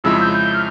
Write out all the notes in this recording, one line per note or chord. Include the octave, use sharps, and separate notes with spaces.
F2 C#3 F3 G#3 E4 E6
G6
G6
F6